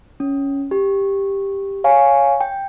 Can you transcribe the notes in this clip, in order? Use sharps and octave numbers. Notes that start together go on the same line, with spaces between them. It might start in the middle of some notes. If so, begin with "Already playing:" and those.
C#4
G4
C#5 F5 G#5 C#6
G5